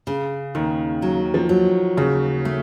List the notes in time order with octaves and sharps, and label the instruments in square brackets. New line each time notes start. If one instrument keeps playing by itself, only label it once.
[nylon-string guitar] C#3
[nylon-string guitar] D#2 [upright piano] D#3
[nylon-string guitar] F#3
[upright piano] F3
[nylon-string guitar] F#3
[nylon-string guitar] D#2 [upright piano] C#3
[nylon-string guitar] A3